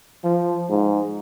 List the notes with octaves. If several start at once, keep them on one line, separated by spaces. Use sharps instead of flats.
F3
G#2